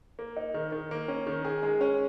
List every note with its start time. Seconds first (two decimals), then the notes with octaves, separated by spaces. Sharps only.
0.19 A#3
0.37 D#4
0.54 D#3
0.72 D#3
0.91 A#3
1.08 C#4
1.27 D#3
1.45 G#4
1.63 G#3
1.81 C#4